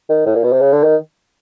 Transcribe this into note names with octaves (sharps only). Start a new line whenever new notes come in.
D#3
A2
A#2
B2
C3
C#3
D3
D#3